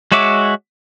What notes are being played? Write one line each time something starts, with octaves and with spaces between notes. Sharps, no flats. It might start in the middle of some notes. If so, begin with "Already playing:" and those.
G#3 F#4 C#5 E5 D6